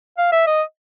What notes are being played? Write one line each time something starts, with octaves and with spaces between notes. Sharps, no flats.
F5
E5
D#5